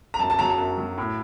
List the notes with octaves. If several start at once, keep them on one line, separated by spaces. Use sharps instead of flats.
A#5
F#2 A5
A5
F#3 A#5
A5
F#2
F#3
A2